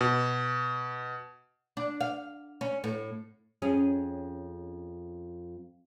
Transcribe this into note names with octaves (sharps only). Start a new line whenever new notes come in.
B2
D4
F5
C#4
A2
F2 C#4 G#4